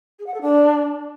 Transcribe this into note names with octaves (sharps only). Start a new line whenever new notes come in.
G#4
F#5
A4
D4